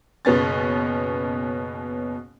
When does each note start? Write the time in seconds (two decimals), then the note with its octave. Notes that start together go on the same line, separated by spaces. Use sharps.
0.25 F#1 B2 B3 C#4 A6